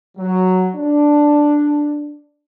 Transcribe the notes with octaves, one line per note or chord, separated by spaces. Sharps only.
F#3
D4